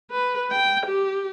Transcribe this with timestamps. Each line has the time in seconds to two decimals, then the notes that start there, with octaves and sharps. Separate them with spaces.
0.11 B4
0.51 G5
0.86 G4